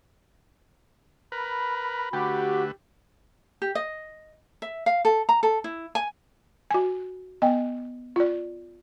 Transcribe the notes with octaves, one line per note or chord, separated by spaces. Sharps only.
A#4 B4 B5
D3 A3 F#4 G4 B4
G4
D#5
E5
F5
A4
A#5
A4
E4
G#5
F#4 G#5
B3 D#5 G5
F4 D5